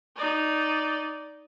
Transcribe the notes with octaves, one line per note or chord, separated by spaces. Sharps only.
D#4 D5